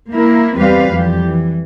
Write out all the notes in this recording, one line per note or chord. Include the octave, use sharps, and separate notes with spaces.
A#3 E4 A#4
E2 G3 C4 G4 B4 F5
F2 E3 G3 G4
E3